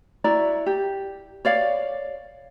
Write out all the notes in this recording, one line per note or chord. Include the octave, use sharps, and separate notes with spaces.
E4 F#4 D5 A#5
G4
C#5 D5 F5